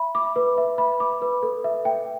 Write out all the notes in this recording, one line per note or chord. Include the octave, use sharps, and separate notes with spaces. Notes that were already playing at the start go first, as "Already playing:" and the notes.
Already playing: E5 B5
D6
B4
E5
B5
D6
B4
A4
E5
G5